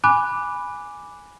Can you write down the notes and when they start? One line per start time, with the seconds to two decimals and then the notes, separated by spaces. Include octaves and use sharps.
0.04 G#5 B5 D6 F#6